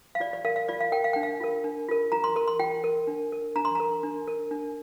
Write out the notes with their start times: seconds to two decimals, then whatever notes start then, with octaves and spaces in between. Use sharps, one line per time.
0.15 F5
0.20 F4 D5
0.33 D5
0.45 A#4 F5
0.56 F5
0.68 F4 D5
0.81 F5
0.92 A#4 G5
1.04 F5
1.13 D4 G5
1.23 F5
1.40 F4 A#4
1.64 D4
1.89 F4 A#4
2.12 F4 A#5
2.24 C6
2.36 A#4 C6
2.48 C6
2.59 F4 G5
2.84 A#4
3.07 D4
3.32 A#4
3.56 D4 A#5
3.65 C6
3.75 A#4 A#5
4.03 D4
4.27 A#4
4.51 D4